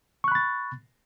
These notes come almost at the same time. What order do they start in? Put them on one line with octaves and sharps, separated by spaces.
C#6 F#6 B5 A6